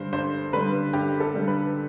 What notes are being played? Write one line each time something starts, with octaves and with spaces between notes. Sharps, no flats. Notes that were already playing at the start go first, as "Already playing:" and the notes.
Already playing: G2 D3 G3 C5
G2 C5
D3 G3 B4
G2 G4
A4
D3 G3
B4